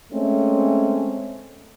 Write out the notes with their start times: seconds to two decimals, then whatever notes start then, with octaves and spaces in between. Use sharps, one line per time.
0.13 G#3 A3 C4 C#4